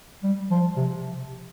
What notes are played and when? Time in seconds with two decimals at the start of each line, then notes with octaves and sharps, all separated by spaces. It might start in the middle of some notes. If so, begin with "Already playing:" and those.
0.24 G3
0.51 F3
0.77 C3